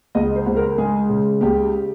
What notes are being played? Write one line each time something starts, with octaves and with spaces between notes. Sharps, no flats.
C#2 D#5
C5
C#2
A#4
G#3 G#4
C#3
C#2 G4